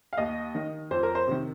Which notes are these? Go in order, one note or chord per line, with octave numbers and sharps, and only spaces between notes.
F5
D#2 D#5
D#3
F2 C5
A#4
C5
C3 D#3